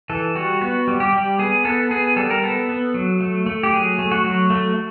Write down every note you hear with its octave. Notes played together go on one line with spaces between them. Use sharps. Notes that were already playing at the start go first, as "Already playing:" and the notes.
E3 A4
G3 F#4
B3 F#4
G3
G4
G3
B3 G#4
B3 A4
B3 G#4
G3 A4
A#4
B3 A4
B3
F#3
A3
A3
G4
F#3 G#4
A3
F#4
F#3
A3